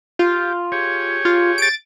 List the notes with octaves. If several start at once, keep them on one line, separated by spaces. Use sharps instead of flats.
F4 G4
G4 G#4 C#5
F4
A6 D7